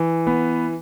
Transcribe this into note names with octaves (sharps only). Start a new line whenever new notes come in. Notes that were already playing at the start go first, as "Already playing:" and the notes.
Already playing: E3
B3